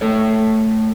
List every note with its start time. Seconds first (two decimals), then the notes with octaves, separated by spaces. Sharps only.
0.01 A3 A4 C#5